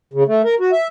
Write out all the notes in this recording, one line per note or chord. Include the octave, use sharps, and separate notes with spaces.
C#3
A3
A#4
F#4
E5